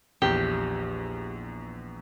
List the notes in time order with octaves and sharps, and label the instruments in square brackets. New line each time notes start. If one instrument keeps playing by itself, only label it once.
[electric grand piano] A#1 E2 [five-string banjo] G4